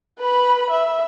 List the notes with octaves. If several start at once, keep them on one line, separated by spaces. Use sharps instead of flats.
B4 B5
E5